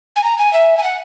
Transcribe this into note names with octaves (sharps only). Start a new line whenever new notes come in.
G#5
A#5
G#5
E5
G#5
F#5